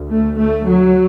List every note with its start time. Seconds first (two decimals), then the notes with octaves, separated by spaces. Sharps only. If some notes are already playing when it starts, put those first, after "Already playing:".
Already playing: D2
0.10 A3
0.39 A3
0.67 F#3